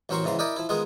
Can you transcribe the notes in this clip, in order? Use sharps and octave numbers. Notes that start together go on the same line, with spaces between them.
A1 F#3 C4 A#4 C6 C#6
G#2 C#3 E3 A#5 C6
E4 A#4 D5 D#5 G5 B5
F3 E4
D#3 G#3 B3 F4 G#4